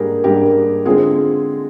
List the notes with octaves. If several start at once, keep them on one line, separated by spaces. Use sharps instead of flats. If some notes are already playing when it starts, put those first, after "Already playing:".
Already playing: G#2 G3 A#3 D4 G4 G#4 A#4
G#2 G3 A#3 D4 G4 A#4
D3 G#3 C4 F4 G#4